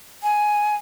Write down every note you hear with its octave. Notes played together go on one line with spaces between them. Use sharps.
G#5